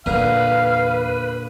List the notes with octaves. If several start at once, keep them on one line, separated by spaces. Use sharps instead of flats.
E2 A#2 D3 A#4 B4 F5